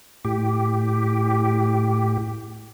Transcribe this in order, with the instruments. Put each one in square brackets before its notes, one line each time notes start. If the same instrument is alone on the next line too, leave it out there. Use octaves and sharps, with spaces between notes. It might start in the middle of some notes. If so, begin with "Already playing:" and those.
[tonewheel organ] A2 G4